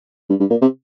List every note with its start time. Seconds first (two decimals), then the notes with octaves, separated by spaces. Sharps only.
0.29 G2
0.40 G2
0.50 A#2
0.61 C3